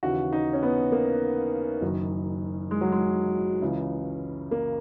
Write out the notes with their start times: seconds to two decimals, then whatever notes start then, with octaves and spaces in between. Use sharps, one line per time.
0.03 D#2 C#3 E3 F#4
0.33 D#4
0.53 C#4
0.63 B3
0.92 A#3
1.82 F#1 F#2 D#3
2.71 G#3
2.81 F#3
2.92 G#3
3.61 C#2 C#3 E3
4.51 A#3